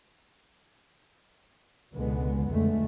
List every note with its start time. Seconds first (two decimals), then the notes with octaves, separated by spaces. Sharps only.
1.94 C#2 B2 D3 G#3 B3
2.49 F2 D3 G#3 A3